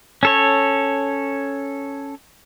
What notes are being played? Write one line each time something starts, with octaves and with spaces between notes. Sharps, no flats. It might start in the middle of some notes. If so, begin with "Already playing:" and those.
C#4 A4 C#5